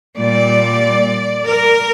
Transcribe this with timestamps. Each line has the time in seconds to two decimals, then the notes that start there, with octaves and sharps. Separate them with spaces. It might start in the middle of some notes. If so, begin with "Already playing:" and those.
0.18 A#2 G3 D5
1.46 A#4